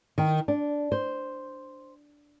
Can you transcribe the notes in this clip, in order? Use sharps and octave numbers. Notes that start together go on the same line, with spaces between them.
D#3
D4
C5